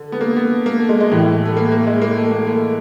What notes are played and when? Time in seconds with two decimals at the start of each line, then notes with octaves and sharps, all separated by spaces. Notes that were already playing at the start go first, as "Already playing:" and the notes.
Already playing: D3
0.12 B3
0.21 A#3
0.37 B3
0.66 A#3
0.78 A3
0.89 G#3
1.00 G#3
1.11 A2 E3 G3 A3
1.45 A3
1.57 A#3
1.72 A#3
1.87 G#3
2.02 A#3
2.17 A3
2.31 A#3
2.47 A3